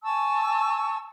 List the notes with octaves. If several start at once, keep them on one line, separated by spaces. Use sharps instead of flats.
G#5 A5 C#6 E6